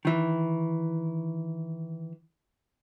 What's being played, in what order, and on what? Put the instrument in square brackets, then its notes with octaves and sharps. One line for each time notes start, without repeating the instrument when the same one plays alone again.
[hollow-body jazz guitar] D#3 E3